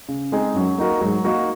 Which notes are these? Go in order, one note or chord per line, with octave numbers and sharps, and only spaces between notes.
C#3
G#3 C4 D#4 G#4
F#2 F#3
A#3 D#4 F#4 A#4
G#2 F#3
A#3 D#4 F#4 A#4